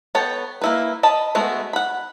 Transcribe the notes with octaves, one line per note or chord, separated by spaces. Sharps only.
B3 A4 C#5 G5
A#3 E4 B4
D#5 A5 B5
G#3 A3 B3 F#4
F#5 B5